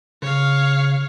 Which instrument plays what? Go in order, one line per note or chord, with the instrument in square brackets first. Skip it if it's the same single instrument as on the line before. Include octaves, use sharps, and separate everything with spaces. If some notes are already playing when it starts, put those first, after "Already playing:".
[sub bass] C#3 [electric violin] C#5 F5